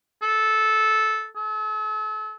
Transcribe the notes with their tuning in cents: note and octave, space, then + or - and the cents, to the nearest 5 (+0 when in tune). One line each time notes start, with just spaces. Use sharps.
A4 -15
A4 -40